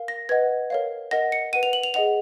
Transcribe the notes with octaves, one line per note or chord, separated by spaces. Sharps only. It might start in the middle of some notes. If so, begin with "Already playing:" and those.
Already playing: A#4 F5
A#6
B4 D#5 F#5 G#6
A#4 C#5 F5
A#4 D#5 F#5 A#6
C#7
B4 F#5 D#7
F7
F#7
F7
G#4 D#5 F#5 F7